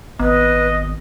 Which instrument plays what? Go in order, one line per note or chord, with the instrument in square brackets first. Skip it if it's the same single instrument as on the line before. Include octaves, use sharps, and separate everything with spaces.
[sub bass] G#1 [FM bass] B3 [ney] B4 [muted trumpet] D#5